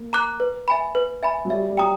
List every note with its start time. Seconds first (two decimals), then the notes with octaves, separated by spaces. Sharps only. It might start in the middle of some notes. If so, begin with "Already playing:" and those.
Already playing: A#3
0.13 A#5 D6 F#6
0.40 B4
0.68 E5 G#5 B5
0.95 B4
1.23 E5 G#5 B5
1.45 F#3
1.50 G3 E5
1.70 G3
1.77 F#3 G5 A#5 D#6